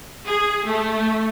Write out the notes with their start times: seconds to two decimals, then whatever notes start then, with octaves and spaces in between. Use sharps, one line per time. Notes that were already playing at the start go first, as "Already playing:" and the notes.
0.26 G#4
0.66 A3